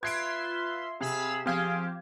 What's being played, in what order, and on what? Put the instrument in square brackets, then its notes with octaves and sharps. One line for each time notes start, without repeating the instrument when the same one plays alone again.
[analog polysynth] F4 E5 C6 [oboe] B4 [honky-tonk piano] G#6 C7 D7
[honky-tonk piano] C3 [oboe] G#4 [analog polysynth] F5 B5 E6
[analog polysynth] F3 G4 [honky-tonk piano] C4 F5 G#6 [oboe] G#4